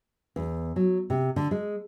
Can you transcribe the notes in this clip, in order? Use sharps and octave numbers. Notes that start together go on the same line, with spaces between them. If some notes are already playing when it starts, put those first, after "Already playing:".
E2
F#3
C3
D3
G#3